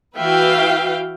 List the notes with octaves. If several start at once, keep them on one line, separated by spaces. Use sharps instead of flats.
E3 F#4 B4 E5 F5 G5